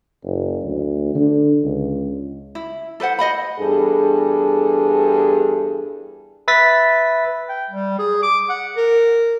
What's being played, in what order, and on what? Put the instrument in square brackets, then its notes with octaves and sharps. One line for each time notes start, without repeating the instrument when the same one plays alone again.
[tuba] F#1
D2
D3
C#2
[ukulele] E4
A4 B4 C5 F#5
C5 D#5 F#5 B5
[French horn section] E2 G2 G#4 A4
[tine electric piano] B4 E5 A6 B6
[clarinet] G5
G3
G#4
D6
F#5
A#4